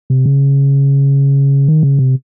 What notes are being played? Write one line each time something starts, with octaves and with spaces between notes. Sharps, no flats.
C3
C#3
D#3
C#3
C3